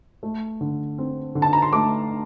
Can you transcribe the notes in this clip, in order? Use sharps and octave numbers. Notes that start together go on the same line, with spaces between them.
A3
D3
C4
D3
A5
A#5
C6
A3 D6